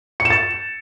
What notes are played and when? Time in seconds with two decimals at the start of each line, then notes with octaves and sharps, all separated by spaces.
0.20 C#7
0.25 E7
0.30 A6